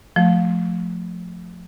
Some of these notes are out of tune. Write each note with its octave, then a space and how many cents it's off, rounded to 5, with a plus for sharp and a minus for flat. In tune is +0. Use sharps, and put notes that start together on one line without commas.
F3 +20 A3 +0